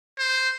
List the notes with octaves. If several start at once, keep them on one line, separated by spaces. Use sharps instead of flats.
C5